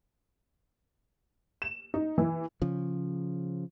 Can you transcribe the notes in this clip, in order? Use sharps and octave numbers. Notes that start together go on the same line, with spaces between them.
E7
D#4
E3
C#3 F3